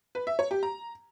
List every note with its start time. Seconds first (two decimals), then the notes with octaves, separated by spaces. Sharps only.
0.15 B4
0.27 E5
0.39 C#5
0.51 G4
0.63 A#5